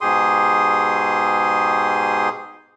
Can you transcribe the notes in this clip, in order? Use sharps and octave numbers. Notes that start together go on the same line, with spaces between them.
G#2 B2 G4 G#4 C6 D#6